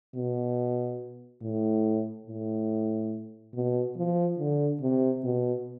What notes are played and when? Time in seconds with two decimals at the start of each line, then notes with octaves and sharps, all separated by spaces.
0.14 B2
1.42 A2
2.27 A2
3.54 B2
3.96 F3
4.39 D3
4.81 C3
5.24 B2